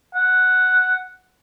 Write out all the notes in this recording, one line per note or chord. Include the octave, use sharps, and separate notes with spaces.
F#5